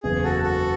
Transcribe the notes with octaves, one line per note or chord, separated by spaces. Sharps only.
F#1 E2 C#3 G#4
F#4 A4
F#4 A4